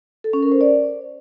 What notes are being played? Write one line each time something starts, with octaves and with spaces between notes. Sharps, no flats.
A4
C#4
A#4
C5
D5